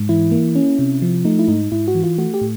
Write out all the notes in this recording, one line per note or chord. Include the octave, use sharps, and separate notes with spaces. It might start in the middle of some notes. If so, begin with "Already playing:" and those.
Already playing: G#2
E3 E4
A#3
C#4
C3
F3
A3 D#4
E4
G#2 D#4
G#2 E4
F#4
E3
F4
A3 F#4
G4
A2